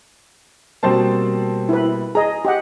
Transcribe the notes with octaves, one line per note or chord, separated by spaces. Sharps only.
B2 G3 A#3 C4 C5 A5
E4 B4
G#4 D#5 A#5
G4 D#5 F#5